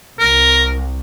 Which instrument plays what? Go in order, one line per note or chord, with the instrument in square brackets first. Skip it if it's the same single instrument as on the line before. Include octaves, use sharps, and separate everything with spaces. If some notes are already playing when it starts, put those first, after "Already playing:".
[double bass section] C2 [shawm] A#4